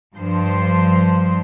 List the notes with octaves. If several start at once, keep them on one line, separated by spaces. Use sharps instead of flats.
G2 F3 C5